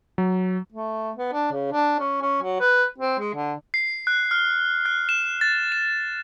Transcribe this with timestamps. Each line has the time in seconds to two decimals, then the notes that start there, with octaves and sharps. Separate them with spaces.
0.18 F#3
0.73 A3
1.16 B3
1.32 D4
1.51 C#3
1.72 D4
1.99 C#4
2.21 C#4
2.42 F#3
2.60 B4
2.98 C4
3.19 G#3
3.34 D3
3.74 C7
4.07 F#6
4.31 F6
4.86 F#6
5.09 E7
5.41 A6
5.72 E7